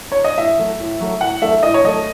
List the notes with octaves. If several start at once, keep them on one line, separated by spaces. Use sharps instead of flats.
C#5
D#5
A2 E5
F#3 A3
A2
F#3 A3
A2 F#5
F#3 A3 E5
A2 D#5
C#5
F#3 A3 D#5